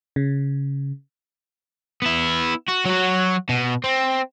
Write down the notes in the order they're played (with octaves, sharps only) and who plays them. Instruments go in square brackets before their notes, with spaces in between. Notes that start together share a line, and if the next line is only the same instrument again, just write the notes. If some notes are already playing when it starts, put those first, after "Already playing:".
[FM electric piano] C#3
[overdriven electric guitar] B3 E4
F#4
F#3 F#4
B2
C4